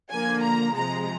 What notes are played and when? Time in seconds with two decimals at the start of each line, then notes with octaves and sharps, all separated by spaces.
0.11 D3 F3 A#3 G#5
0.43 A#5
0.76 C3 F3 G#3 A#5